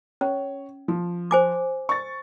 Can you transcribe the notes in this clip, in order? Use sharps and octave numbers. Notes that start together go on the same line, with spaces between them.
C#4 C#5
F3
C5 G#5 D6
C#6 A6